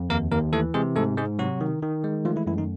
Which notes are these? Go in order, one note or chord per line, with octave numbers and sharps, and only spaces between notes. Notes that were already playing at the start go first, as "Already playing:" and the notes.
Already playing: F2
D#2 A#3 A#4
D#2 A#3 A#4
E3 A3 A4
C3 G#3 G#4
G#2 A3 A4
G#2 G#3 G#4
C3 F#3 F#4
D#3
D#3
G#3
F3 A3 F4
E3 E4
F#2 E3 E4
D#3 D#4